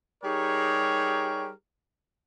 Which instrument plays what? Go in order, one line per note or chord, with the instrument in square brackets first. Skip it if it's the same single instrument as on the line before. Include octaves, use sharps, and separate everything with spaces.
[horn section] G3 D#4 G4 G#4 A#4 C#5